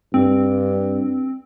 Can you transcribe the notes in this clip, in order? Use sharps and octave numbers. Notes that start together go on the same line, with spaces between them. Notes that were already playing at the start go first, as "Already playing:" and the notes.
G2 C4